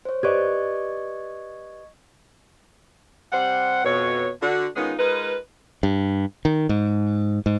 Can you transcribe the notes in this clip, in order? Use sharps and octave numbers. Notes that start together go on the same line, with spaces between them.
C5 C#5
G4 B4 D5 D#5 C#6 G#6
C3 G3 C5 F#5
F2 B2 C#5
D3 F#4
D#3 G#3 B3 C#4 D#4 F4
G#3 D#4 F4 A#4 B4
G2
D#3
G#2
G#2